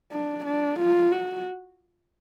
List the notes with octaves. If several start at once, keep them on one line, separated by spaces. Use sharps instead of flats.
D4
D4
F4
F#4